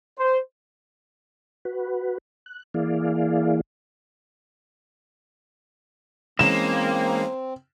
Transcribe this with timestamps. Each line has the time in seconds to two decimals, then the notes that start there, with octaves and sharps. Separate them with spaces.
0.19 C5
1.65 F#4 B4
2.46 F#6
2.74 E3 A#3 E4 G#4 D5 F5
6.39 E3 G#3 A#3 C4 C#4 E7